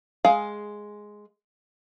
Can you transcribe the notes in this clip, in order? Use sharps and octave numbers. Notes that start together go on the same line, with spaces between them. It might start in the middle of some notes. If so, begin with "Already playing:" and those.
G#3 G#4 F5